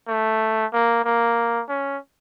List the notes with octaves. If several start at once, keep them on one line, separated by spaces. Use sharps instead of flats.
A3
A#3
A#3
C#4